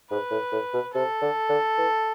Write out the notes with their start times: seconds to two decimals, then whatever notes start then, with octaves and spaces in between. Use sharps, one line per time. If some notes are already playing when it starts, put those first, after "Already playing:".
0.11 G#2 B4
0.31 A2
0.52 A2
0.73 B2
0.94 C3 A4
1.22 D3
1.49 D3
1.78 E3